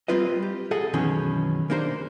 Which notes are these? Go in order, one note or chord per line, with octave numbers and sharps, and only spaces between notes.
G3 A#3 C4 F4 B4 D#5
G4
G#4 A4 D#5 F#5 A5
F#2 B2 D#3 E3 C#4
A#3 D4 D#4 A4 C5